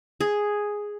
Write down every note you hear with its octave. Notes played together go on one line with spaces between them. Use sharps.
G#4